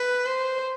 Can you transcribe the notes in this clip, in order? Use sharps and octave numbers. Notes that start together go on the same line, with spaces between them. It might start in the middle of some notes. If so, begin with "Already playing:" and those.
Already playing: B4
C5